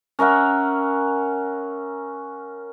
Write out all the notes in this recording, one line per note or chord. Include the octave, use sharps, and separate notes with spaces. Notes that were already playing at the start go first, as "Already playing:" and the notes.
C#4 A#4 E5 F#5